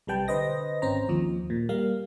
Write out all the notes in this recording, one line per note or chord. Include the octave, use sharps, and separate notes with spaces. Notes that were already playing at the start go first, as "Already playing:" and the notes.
B1 C3 G3 B4 G5 A5
D3 B4 C5 D#5 A#6
G#1 C4 C#4 C5 A#5
D#2 F3
A#2
G3 A#3 F5